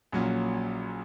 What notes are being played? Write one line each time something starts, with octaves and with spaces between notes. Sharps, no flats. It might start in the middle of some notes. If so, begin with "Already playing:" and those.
A#1 A#2 F#3 C#4